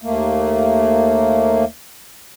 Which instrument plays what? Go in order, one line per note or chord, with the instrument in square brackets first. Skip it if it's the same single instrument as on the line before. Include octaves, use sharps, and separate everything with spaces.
[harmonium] D#2 A3 A#3